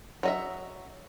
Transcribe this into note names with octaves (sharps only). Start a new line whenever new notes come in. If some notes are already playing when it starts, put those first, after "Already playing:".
F#3 D#5 E5